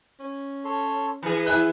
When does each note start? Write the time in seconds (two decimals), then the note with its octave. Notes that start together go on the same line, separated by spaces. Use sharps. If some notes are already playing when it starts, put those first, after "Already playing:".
0.20 C#4
0.65 A4 C#5 C6
1.23 E3 G#4 B4 A#5
1.46 E4 F#5 G#5 F#6